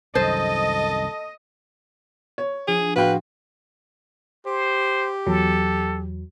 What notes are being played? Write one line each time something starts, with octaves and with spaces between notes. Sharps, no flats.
C2 F#2 D#3 A4 C5 D#5
C#5
F3 D4 F4 G#4
A2 F#4 G#4 B4 F5 G5 C6
G4 C5
E2 F#3 A4